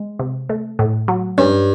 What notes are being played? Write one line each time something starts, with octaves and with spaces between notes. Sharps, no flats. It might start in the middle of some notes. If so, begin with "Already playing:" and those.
Already playing: G#3
C3
A3
A2
F#3
G2 C#4